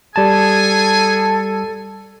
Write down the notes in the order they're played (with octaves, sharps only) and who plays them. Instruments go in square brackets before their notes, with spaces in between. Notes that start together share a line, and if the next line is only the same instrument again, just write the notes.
[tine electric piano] G3 A5 [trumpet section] G#4 G#5 [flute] A4